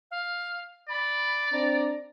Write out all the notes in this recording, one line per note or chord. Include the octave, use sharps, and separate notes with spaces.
F5
D5 B5
C4 D4 A#5